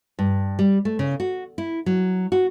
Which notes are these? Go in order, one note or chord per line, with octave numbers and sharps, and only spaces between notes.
G2
G3
A3
C#3
F#4
E4
F#3
F#4